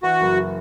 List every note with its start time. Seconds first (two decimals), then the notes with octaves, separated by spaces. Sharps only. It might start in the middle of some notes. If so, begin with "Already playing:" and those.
0.03 E3 F#4
0.21 F#1